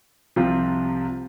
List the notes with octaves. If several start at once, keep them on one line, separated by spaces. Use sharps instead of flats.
C2 C3 F3 C4 F4